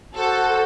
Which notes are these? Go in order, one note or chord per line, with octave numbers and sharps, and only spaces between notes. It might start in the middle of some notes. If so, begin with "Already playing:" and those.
F#4 A4 C5 F#5